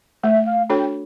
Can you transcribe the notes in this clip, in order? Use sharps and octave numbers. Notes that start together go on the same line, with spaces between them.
A3 E5
F5
D4 F#4 A4 C#5 G5